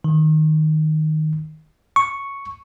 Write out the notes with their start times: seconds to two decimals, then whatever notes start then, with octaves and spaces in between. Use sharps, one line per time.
0.04 D#3
1.96 C#6